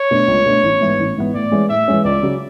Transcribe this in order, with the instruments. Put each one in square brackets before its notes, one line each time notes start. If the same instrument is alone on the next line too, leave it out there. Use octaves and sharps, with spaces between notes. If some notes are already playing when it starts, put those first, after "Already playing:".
Already playing: [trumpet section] C#5
[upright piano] B2 A3 D4
C#2
B2 A3 D4
A1
G#2 E3 B3
A1
G#2 E3 B3
[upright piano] A2 [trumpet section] D5
[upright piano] E3 G#3 C#4
[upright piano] A2 [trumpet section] E5
[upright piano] E3 G#3 C#4
[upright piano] C#2 [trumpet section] D5
[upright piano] C#3 F#3